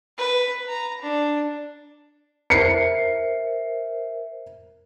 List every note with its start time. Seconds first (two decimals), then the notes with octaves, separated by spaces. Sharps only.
0.18 B4
0.68 A#5
1.02 D4
2.50 A#4 C5 E5 C7 C#7